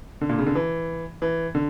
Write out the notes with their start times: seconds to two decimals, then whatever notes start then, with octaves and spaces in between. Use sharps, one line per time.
0.21 D3
0.29 A#2
0.39 C#3
0.46 D3
0.55 E3
1.22 E3
1.55 D3